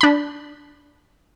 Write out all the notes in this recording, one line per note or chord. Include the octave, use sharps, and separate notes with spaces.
D4 B5